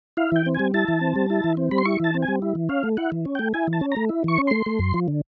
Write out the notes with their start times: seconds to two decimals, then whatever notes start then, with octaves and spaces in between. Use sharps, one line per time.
0.17 E4 F5
0.32 E3 G5
0.46 C4
0.55 G3 G#5
0.74 E4 A5
0.88 E3
1.01 C4
1.16 G3
1.30 E4
1.44 E3
1.57 C4
1.71 G3 B5
1.78 C6
1.85 E4 C#6
2.00 E3 A5
2.14 C4
2.22 G#5
2.28 G3
2.42 E4
2.55 E3
2.69 C#4 F5
2.83 A3
2.97 E4 F#5
3.12 E3
3.25 C#4
3.35 A3 G5
3.54 E4 G#5
3.67 E3
3.73 A5
3.81 C#4
3.92 A3 A#5
4.09 E4
4.24 E3 C#6
4.38 C#4
4.47 A3 C6
4.66 A3
4.79 F#2
4.94 F3
5.08 D3